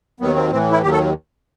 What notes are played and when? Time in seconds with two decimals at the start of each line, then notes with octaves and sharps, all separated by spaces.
0.20 D#2 D#3 F#3 B3
0.36 C4
0.51 A2 E3 C4
0.72 E4
0.82 D#2 D#3 F#3 G4
0.92 A4